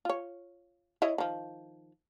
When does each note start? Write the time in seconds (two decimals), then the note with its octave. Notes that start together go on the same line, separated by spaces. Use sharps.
0.05 F4 C#5
1.02 E4 C#5 D#5
1.18 D#3 F3